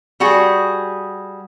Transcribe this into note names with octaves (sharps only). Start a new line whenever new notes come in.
G3 F#4 G#4